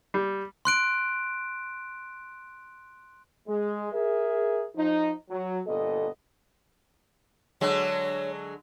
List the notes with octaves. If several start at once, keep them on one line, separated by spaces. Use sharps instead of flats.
G3
C6 F#6 D7
G#3
G#4 A#4 E5
F3 D#4
F#3
G1 A#2 B3 A4 D#5
D3 F#3 G#3 C#5